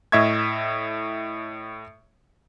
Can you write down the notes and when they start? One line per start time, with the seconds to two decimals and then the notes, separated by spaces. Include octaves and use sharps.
0.12 A2 D#5 E5 C#6 G#6